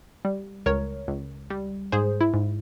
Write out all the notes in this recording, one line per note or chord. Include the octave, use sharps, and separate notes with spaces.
G3
C#2 A#4 C#5
C#2
G3
G#2 G#4 C5
E4
G#2